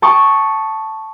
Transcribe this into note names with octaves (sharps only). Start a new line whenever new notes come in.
G5 A5 C#6 D#6